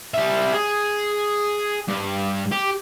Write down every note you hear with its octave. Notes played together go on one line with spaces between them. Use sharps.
G3 E5
G#4
G2
G4